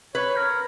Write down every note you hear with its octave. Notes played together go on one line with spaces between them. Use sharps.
B4 C#5
A#4